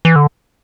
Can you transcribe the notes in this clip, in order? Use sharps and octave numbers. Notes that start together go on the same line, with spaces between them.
E3
D3